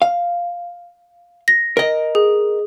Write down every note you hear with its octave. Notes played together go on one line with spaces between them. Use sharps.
F5
A#6
A#4 D#5
G#4